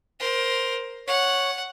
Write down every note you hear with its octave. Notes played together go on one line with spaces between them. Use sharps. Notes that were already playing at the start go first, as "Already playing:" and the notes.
A#4 C5
C#5 F#5